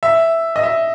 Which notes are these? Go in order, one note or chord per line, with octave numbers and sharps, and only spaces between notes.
E5
D#5
E5